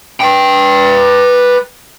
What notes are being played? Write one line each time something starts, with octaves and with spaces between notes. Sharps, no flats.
B4 G5